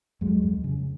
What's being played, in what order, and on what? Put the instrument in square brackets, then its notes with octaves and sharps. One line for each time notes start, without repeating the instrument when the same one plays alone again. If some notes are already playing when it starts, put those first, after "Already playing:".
[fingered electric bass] F2 F#3 G#3
F2
C#3